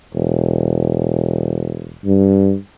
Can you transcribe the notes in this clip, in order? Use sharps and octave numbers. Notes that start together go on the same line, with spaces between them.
E1
G2